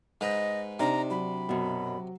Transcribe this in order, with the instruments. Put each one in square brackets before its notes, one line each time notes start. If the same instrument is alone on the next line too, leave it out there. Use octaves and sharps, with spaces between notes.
[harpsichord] G#2 B4 [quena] D#5
[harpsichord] C3 [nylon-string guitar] D4 [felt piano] D#4 [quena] A#5
[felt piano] F#3 [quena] B5
[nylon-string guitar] F#2 B2 [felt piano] F#3